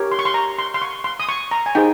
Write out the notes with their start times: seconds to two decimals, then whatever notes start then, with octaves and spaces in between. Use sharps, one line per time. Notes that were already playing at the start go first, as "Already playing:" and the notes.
Already playing: G4 A#4 C#5
0.11 C6
0.19 C#6
0.25 C6
0.34 A#5
0.58 C6
0.74 C6
0.82 C#6
1.04 C6
1.20 D#6
1.29 C#6
1.51 A#5
1.66 G#5
1.75 D#4 G#4 C5 G5